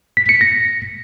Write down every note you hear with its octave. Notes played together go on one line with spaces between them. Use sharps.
B6
C#7
A#6